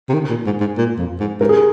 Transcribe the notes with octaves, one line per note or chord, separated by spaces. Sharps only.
C3
D#3
A#2
G#2
G#2
A#2
F2
G#2
G#2 A#4
G#4